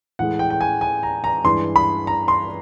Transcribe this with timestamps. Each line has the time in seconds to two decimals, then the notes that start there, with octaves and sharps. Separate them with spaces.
0.19 A2 E3 G#3 F#5
0.39 G5
0.50 G5
0.61 G#5
0.81 G#5
1.03 A#5
1.24 A#5
1.44 G2 E3 G#3 C6
1.76 B5
2.07 A#5
2.28 C6